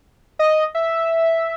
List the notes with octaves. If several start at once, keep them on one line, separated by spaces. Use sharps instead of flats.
D#5
E5